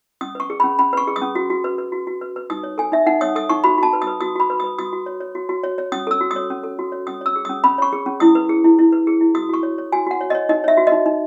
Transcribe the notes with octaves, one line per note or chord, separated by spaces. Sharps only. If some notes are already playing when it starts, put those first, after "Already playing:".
C#4 D#6
B4 C#6
G#4
B5
C#4
C#4 B5
B4 C#6
G#4
D#6
C#4
F#4
F#4
B4
B4
F#4
F#4
B4
B4
D#4 D#6
C#5
A4 G#5
D#4 E5
D#4 F#5
C#5 D#6
A4 D#6
D#4 C#6
F#4 B5
F#4 A5
B4
D#6
B4
F#4 D#6
F#4 B5
B4
D#6
B4
F#4 D#6
F#4
C#5
C#5
F#4
F#4
C#5
C#5
C#4 D#6
A4 E6
F#4
D#6
C#5
C#4
A4
F#4
C#5
C#4 D#6
C#5 E6
G#4
D#6
C#4
C#4 B5
C#5 C#6
G#4
C#4
E4 D#6
B4
G#4
E4
E4
B4
G#4
E4
F#4 D#6
F#4 C#6
C#5
C#5
F#4 G#5
F#4 F#5
C#5
D#5
C#5
D#4 D#5
C#5 E5
F#4
D#5
D#4
D#4